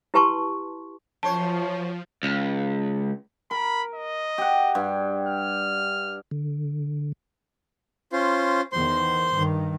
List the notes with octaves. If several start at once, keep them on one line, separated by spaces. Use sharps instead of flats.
E4 G4 B4 A5 C6 C#6
F#2 F3 C5 C#5 A5
C#2
A#4 B5
D#5
G4 F#5
G2
F6
D3
C#4 F4 C5
E2 D#3 C5 C6
G2 D#3